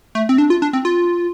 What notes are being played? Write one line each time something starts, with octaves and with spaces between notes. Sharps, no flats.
A3
C4
D4
F4
D4
C4
F4